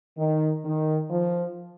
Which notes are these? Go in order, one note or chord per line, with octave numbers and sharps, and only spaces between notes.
D#3
D#3
F3